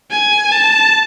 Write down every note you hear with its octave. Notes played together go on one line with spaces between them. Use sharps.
G#5
A5